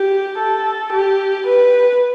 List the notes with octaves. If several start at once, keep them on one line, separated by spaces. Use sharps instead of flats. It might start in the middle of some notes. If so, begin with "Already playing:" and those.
Already playing: G4
A4
G4
B4